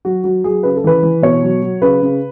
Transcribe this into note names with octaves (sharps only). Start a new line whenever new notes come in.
F#3 F#4
F#3 F#4
F#3 G#4
C#3 B4
A4
E3 B4
E3
B2 C#5
F#3
F#3
C#3 B4
C#3